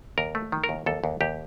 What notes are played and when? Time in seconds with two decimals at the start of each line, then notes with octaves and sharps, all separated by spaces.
0.18 D#2 A#4
0.35 A3
0.52 D#3
0.64 A#4
0.69 D#2
0.86 D#2 A4
1.04 D#2
1.21 D#2 G4